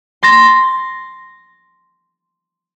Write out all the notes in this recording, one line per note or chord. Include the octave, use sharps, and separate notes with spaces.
C6 A6 A#6